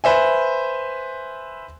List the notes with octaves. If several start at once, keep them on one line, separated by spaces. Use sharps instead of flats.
B4 C5 E5 G#5